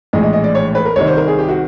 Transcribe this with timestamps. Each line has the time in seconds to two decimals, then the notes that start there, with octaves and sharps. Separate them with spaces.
0.13 A#1 A2 E3 G#3 D#5
0.23 D#5
0.33 D#5
0.44 D5
0.55 C#5
0.75 B4
0.85 A#4
0.96 C2 C3 D#3 C#5
1.07 C5
1.17 A#4
1.28 G#4
1.39 G4
1.49 F#4